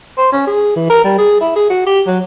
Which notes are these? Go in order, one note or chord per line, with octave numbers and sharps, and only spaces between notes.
C5
C#4
G#4
E3
A#4
G3
G#4
E4
G#4
F#4
G4
F#3